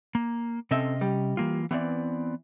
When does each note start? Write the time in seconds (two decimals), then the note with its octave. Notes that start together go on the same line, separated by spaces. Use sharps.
0.15 A#3
0.71 C3 C4 C#4 A4 D#5 E5
1.01 G3
1.37 E3 A#3 F4
1.71 E3 B3 C4 D5